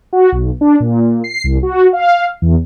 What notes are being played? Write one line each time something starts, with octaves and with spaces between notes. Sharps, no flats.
F#4
B1
D4
A#2
C7
C2
F#4
F5
E2